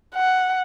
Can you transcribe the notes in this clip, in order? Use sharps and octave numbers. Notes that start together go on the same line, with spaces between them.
F#5